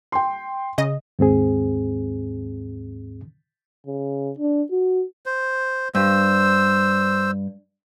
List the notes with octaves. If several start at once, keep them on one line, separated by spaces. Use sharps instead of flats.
G5 C6
C#3 D#5
D#2 G#2 C4 G#4
C#3
D4
F#4
C5
G2 C5 E6